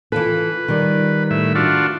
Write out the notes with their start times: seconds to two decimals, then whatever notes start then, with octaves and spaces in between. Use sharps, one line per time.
0.12 E3 F4 A4 B4
0.68 D#3 G3
1.31 A2 E5
1.55 D4 F4 F#4